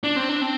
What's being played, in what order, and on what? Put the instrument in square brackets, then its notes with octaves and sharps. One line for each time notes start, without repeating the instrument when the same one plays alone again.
[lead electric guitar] D4
C4
D4
C4